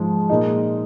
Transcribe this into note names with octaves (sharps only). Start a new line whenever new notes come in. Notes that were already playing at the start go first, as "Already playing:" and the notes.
Already playing: G#2 F3 G#3
A#2 G#3 D#4